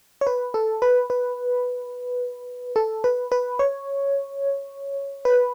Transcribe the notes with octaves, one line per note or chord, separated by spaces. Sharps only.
C#5
B4
A4
B4
B4
A4
B4
B4
C#5
B4